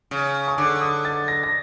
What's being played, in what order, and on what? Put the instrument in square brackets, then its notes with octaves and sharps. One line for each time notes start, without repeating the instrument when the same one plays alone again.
[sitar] C#3
[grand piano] C#6
[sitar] D3 [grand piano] D6
[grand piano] D#6
A6
A#6
A#6